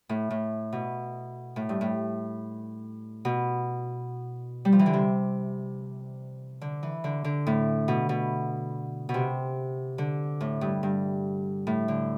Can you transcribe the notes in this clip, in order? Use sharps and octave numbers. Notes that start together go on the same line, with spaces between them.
A2
A2
B2
A2
G2
A2
B2
G3
F3
E3
D3
C3
D3
E3
D3
D3
A2
B2
B2
B2
C3
D3
A2
G2
G2
A2
D3